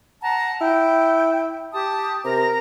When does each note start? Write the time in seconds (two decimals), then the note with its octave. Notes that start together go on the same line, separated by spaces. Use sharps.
0.20 F#5 A5 A#5
0.61 E4 G5
1.72 G4 A5 D#6
2.24 C3 A#4 A#5